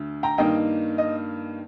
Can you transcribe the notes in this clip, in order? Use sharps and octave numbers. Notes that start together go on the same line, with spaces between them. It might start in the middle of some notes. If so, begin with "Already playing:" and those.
Already playing: D2 D3
G5 A#5
G2 D#3 A#3 D#4 D#5 G5
D#5